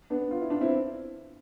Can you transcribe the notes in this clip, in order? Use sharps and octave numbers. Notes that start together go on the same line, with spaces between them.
B3 D4
F4
E4
D4
C4 E4